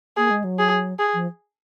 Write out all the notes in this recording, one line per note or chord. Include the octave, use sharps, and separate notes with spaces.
A#3 G#4
G#3
F#3
G#4
G#4
F3